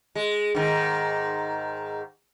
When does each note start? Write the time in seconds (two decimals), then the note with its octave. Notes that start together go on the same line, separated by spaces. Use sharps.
0.15 G#3
0.55 G#2 D#3